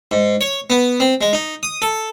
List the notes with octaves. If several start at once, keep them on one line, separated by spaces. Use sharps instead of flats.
G#2
C#5
B3
C4
G#3
D#4
D#6
A4